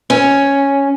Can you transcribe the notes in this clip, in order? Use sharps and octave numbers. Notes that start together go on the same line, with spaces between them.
C#4